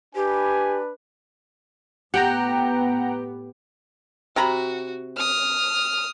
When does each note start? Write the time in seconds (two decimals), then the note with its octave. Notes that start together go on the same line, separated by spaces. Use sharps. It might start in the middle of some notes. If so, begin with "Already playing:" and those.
0.15 D4 G4 B4 G#5
2.14 A2 B3 G4 F#5 G5 A#5
4.36 C3 F#4 A#5 B5
5.17 D#6 F6